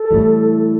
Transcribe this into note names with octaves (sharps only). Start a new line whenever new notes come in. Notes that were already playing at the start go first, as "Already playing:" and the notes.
Already playing: A4
A2 E3 G3